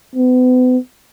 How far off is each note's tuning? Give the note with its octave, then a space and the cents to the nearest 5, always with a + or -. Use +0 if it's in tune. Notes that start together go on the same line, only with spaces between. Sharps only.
B3 +40